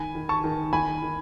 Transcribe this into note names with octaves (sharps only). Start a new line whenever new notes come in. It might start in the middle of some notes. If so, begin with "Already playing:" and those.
Already playing: D#3 G#5 B5
D#3
A5 C#6
D#3
D#3 G#5 B5
D#3